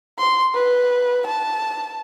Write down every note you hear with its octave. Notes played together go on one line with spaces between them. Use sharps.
C6
B4
A5